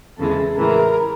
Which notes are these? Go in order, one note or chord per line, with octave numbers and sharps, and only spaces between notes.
E2 C#3 E3 G#3 A4
A2 E3 G#3 A#4